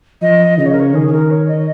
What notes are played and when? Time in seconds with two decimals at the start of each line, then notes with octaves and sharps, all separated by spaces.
0.22 F3 D#5
0.58 C#3 D#5
0.66 C#5
0.72 A#4
0.80 C#5
0.94 D#3 G#4
1.07 G#4
1.13 A#4
1.31 C#5
1.48 D#5